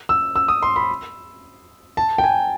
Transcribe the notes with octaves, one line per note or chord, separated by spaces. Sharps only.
E6
E6
D#6
C6
B5
A5
G5
G#5